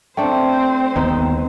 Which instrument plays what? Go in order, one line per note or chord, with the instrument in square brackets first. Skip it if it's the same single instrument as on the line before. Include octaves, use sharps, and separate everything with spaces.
[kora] A3 D4 [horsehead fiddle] C4 C5 [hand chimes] G5
[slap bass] G1 D#2 B3 [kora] D#4